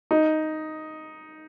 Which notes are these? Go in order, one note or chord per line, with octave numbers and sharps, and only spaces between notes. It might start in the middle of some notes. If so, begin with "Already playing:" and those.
D#4